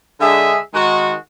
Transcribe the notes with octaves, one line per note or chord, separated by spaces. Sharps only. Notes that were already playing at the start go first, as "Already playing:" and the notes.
D3 G#3 D4 G#4 E5
D#3 G#3 F#4